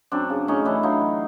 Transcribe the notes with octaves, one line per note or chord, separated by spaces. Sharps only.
F#2 C4 D4
C#3
A2 C#4 D#4
E3 D4 E4
F#3 D#4 F4
F#3